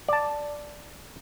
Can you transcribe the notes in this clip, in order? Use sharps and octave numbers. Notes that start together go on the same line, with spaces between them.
D5 A5